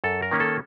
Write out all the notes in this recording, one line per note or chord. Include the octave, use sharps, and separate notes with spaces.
F#2 A4
A#4
D#3 A#3 C#4
A4